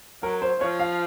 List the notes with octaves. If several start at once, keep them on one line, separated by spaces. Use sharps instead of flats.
F#3 A#4
C5
F3 C#5
F5